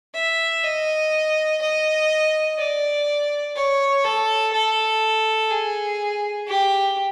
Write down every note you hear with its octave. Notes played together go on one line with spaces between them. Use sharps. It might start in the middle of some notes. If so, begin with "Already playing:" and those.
E5
D#5
D#5
D5
C#5
A4
A4
G#4
G4